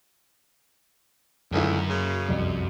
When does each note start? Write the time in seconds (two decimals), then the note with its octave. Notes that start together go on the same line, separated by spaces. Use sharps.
1.53 C#2 F#2 D3 A3 E4
1.89 C#3 A#3
2.28 C2 F2 G3